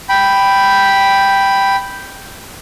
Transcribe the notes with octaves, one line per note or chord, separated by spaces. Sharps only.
G5 B5